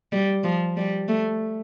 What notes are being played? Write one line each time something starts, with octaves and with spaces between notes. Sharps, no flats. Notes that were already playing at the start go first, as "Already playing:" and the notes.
G3
F3
G3
A3